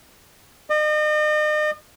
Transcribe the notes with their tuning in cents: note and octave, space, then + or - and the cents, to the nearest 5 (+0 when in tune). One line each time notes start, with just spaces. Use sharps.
D#5 -40